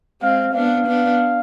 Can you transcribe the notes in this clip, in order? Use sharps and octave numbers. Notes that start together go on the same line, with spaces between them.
G#3 C4 F5
B3 D4 F5
B3 D4